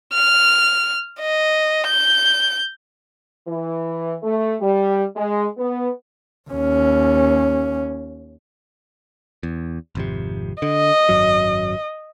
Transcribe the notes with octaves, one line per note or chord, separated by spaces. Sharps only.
F6
D#5
G6
E3
A3
G3
G#3
B3
D#2 C#4
E2
G#1 F2 C3
D3 D#5
G#1 F#2 F#3